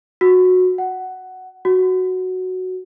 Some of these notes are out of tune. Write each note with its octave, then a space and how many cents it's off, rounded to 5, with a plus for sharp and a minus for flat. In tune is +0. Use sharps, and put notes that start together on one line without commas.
F#4 -15
F#5 +10
F#4 +0